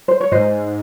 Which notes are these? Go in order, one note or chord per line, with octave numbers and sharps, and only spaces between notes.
C5
C#5
G#2 C5 D#5